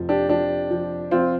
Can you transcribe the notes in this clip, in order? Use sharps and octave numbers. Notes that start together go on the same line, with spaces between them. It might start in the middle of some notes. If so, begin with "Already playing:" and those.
Already playing: F1 F3
D4 G4
F3 D4 G4
F3
F3 C4 F4